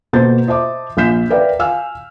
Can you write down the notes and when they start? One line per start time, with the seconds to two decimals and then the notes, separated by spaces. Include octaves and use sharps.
0.13 B2 A#3 A4 C5 G6 A6
0.47 C5 D#5 E5 A5 D6
0.97 A#1 F5 F6 G6 B6 E7
1.30 A#4 B4 D5 E5 F5 G5
1.59 F5 G#5 E6 F6